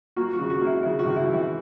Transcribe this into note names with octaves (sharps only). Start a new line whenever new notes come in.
A#3 F#4
F#4
C#3
F#4
A#3
E4
C#3 E4
F#4
C#2
E4
E3
E4